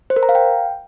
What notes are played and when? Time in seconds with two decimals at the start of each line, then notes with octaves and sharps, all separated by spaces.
0.10 C5
0.16 A#4
0.23 A#5
0.29 F5
0.35 G5